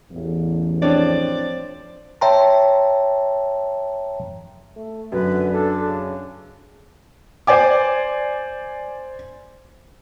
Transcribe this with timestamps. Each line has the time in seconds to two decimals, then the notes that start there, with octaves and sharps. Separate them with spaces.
0.11 A1 E2
0.82 F3 C4 D4 C#5 D5
2.21 C#5 E5 G5 A5 A#5 C6
4.76 A3
5.12 F#2 D3 B4
5.52 D4 A4
5.85 C#3
7.47 C5 D5 G#5 D6